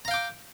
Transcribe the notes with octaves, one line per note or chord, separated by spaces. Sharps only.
F5 G5 A#5 D6